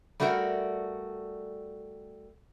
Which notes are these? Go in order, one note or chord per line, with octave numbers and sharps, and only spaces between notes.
G3 A3 F#4 A4 A#4